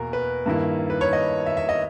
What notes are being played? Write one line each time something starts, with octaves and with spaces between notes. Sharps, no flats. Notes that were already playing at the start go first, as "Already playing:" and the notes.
Already playing: E2 B2 A#3 A#4
B4
G2 D#3 A#3 E4
B4
C#5
D#5
E5
E5
D#5